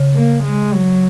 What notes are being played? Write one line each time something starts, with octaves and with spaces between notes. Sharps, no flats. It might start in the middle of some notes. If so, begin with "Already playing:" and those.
Already playing: C#3
A#3
G#3
F#3